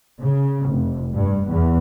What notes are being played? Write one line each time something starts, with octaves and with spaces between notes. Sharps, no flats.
C#3
F1
G2
E2